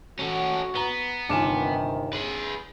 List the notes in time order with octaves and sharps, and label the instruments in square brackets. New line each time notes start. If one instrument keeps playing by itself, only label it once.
[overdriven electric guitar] C#4 A4 [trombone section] F#4
[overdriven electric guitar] B3 [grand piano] A#5 G7
[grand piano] G1 D#4 E7 [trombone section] C3 D#3 [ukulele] D4 F4 G#5
[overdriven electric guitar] G#4 B4